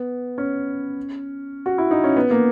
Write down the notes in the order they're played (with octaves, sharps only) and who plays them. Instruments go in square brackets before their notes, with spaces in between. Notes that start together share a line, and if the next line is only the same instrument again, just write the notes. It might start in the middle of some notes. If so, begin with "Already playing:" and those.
Already playing: [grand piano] B3
C#4
F#4
E4
D#4
C#4
B3
A#3